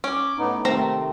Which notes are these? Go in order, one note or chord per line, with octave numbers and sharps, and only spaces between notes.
C#4 D6
A2 B3 D#4
C3 D#3 A3 C4 A#5